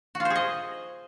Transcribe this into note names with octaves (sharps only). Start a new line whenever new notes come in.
F#4
F4
C5
G#4
D#5